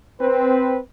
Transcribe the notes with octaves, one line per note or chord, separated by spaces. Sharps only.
C4 B4